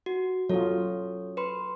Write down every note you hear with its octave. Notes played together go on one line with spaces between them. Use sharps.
F#4
F#3 C#4 F4 A4 C#5
B4 B5 C6